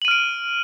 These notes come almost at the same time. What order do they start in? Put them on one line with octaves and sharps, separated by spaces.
F#7 D#7 F6 D7